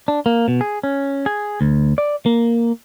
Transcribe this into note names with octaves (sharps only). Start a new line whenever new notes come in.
D4
A#3
B2
G#4
C#4
G#4
D2
D5
A#3